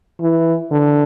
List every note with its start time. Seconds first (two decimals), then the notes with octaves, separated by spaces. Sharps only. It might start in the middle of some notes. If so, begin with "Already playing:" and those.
0.21 E3
0.71 D3